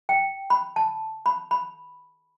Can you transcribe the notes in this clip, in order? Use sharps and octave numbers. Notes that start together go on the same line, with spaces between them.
G5
B5
A5
B5
B5